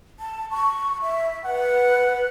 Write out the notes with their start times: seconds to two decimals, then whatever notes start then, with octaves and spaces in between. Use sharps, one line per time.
0.20 A5
0.51 C#6
1.02 E5
1.45 B4 F#5